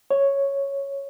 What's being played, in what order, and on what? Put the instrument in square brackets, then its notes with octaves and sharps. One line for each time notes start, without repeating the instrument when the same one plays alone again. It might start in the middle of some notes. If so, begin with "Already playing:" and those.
[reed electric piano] C#5